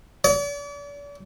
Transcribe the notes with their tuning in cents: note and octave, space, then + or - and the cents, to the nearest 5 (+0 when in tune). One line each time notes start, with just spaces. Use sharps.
D5 -40